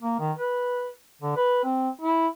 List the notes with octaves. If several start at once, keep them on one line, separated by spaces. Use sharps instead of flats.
A#3
D#3
B4
D3
B4
C4
E4